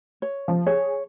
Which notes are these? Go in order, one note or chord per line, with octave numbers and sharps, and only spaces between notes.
C#5
F3
G#4 C#5